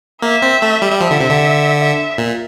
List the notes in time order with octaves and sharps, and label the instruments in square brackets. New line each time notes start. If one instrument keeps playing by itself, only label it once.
[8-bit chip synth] A#3 [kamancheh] E5
[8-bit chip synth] C4
A3
G3
G3
[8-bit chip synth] F3 [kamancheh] E5
[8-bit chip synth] D3
C3
D3
[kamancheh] E5
[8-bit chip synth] A#2